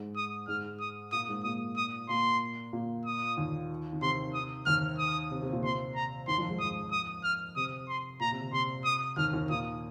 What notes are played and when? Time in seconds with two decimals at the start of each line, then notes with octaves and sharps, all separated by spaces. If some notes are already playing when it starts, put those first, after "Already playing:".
Already playing: G#2 G#3
0.16 D#6
0.47 G#2 G#3 F6
0.80 D#6
1.12 A#2 A#3 D#6
1.28 G#2 G#3
1.44 A#2 A#3 D#6
1.76 D#6
2.09 A#2 A#3 C6
2.73 A#2 A#3
3.05 D#6
3.37 D#2 D#3
3.93 D#3
4.01 C3 C6
4.34 D#6
4.66 D#2 D#3 F6
4.98 D#6
5.31 C3
5.42 C3
5.52 A#2
5.63 C3 C6
5.95 A#5
6.28 D#2 D#3 C6
6.38 F2 F3
6.48 G#2 G#3
6.59 F2 F3 D#6
6.92 D#6
7.24 F6
7.56 C3 D#6
7.88 C6
8.20 A#2 A#5
8.31 C3
8.41 C3
8.52 C3 C6
8.84 D#6
9.17 D#2 D#3 F6
9.33 D#2 D#3
9.49 A#2 A#3 D#6